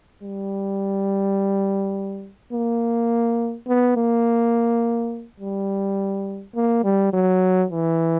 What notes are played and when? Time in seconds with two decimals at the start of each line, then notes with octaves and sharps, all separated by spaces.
0.23 G3
2.53 A#3
3.68 B3
3.97 A#3
5.40 G3
6.55 A#3
6.84 G3
7.13 F#3
7.70 E3